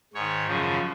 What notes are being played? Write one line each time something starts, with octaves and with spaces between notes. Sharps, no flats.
G#2 D#3 C#5
F#2 C#3 F3